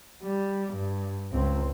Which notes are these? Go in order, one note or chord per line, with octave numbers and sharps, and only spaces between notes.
G3
G2
C#2 C4